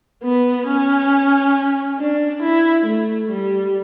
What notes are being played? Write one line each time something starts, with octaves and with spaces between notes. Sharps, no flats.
B3
C#4
D4
E4
A3
G3